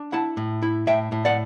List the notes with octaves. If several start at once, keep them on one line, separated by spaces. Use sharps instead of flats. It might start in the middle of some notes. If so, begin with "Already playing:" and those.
Already playing: D4
E4 F#5 A5
A2
E4
A2 E5 G5
A2
D5 F#5